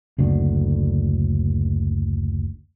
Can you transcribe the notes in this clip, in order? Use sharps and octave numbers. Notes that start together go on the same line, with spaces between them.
F#1 D2 D3